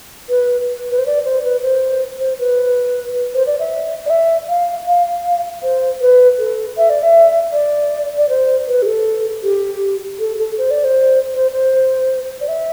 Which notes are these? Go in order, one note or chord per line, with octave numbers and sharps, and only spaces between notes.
B4
B4
C5
D5
C5
B4
C5
C5
B4
C5
D5
E5
D5
E5
F5
F5
C5
B4
A4
E5
D5
E5
D5
D5
C5
B4
G4
A4
G4
A4
A4
C5
D5
C5
C5
C5
D5
E5